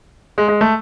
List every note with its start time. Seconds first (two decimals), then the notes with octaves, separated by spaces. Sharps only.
0.38 G#3
0.48 G#3
0.61 A3